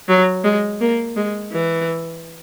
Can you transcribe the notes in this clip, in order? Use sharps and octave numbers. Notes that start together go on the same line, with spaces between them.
F#3
G#3
A#3
G#3
E3